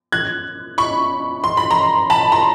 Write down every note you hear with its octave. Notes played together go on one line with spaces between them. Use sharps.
F#6 G#6
B5 C#6
C6
B5
A#5 C6
A5 B5
A#5 C6